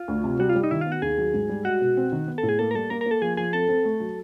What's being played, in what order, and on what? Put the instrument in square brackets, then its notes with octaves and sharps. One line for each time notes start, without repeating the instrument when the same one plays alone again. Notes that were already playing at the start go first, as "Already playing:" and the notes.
Already playing: [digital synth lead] F4
[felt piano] D2
C3
[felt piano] G3 [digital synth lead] F#4
[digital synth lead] F4
[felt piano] G3
[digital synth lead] D#4
[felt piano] D#3 [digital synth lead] E4
[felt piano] B3 [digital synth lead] F4
[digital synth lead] F#4
[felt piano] D#2 [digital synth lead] G#4
[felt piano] F#3
G#2
G3
[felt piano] G#3 [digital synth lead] F#4
[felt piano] B2
C4
D#3
B3
[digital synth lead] A4
[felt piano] A2
[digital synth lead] G#4
[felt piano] A#3 [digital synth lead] A4
[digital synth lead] A#4
[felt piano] G3 [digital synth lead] A4
[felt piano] A#3 [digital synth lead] A#4
[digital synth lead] A#4
[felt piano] A#3 [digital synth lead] A4
[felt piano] F3 [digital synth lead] G#4
[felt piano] F3 [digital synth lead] G#4
[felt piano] C4 [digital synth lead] A4
[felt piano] C4
A3
F#3